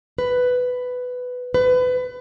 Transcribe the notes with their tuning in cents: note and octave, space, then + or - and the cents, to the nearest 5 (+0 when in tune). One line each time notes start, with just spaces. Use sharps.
B4 +10
B4 +25